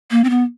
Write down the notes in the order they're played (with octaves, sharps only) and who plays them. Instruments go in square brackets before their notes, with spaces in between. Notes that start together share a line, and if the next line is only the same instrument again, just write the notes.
[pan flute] A#3
C4
B3